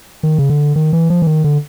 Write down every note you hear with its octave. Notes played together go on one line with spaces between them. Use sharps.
D#3
C#3
D3
D#3
E3
F3
E3
D#3
D3